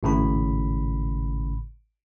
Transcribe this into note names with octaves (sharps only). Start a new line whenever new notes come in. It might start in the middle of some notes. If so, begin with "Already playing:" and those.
G#1 A2 C#3 B5